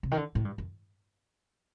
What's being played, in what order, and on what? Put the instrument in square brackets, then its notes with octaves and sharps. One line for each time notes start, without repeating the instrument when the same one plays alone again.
[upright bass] C3
D#3
D3
A2
G2
F#2